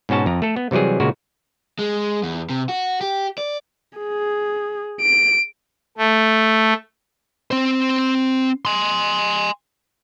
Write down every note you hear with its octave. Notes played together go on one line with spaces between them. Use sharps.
G#2 B2 C#4 F#4 A5
F2 A#5
A3 A4
B3
C3 E3 F#3 G3 G#4
A#2 C#3 G#3 F#4
G#3
E2
C3
F#4
G4
D5
G#4
D7
A3
C4 C5
G#5 C6